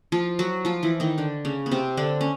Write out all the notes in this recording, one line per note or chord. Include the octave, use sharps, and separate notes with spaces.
F3 F4
F#3 F#4
F3 F4
E3 E4
D#3 D#4
D3 D4
C#3 C#4
B3
C3 C4
D3 D4
C#4